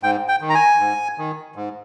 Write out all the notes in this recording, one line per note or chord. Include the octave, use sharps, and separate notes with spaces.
G#2 G5
G5
D#3
A#5
G#5
G#2
D#3
G#2